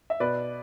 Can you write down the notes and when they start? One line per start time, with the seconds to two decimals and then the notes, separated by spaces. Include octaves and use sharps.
0.10 E5
0.20 B2 B4 D5